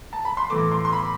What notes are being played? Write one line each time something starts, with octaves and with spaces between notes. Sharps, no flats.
A5
B5
C6
A2 E3 A3 D6
C6
C6
B5